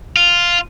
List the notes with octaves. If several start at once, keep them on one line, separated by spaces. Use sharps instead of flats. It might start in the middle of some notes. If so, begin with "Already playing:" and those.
F4